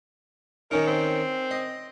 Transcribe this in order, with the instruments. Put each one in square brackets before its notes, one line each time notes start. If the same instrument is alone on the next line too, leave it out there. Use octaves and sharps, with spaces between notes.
[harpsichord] D#3 C#4 D#4 [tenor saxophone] A#4
[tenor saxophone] C4
[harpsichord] D#5